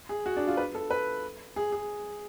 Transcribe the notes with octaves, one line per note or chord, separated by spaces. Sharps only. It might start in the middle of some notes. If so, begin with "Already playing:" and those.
G#4
F#4
D4
F4
B4
A4
B4
G#4
G#4